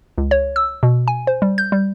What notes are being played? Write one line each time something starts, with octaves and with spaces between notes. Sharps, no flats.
C#2
C#5
E6
B2
G#5
C5
G3
G6
G3